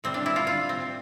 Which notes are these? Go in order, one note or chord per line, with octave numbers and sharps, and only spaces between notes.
A2 G3 C4
D4
E4
F4
F4
C4